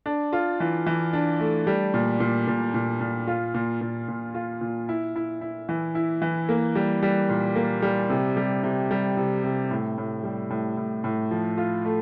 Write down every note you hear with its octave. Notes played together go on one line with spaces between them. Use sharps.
D4
F4
E3
E3
D4
A3
G3
A#2
A#2
A#2
A#2
A#2
F4
A#2
A#2
A#2
F4
A#2
E4
E4
E4
E3
E4
E3
A#3
G3
G3
A#2
A#3
G3
C3
G3
C3
G3
C3
C3
A2
A2
G3
A2
A2
A2
F3
F4
A3